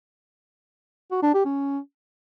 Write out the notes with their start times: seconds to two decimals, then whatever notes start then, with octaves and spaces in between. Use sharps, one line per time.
1.11 F#4
1.23 D4
1.34 G4
1.45 C#4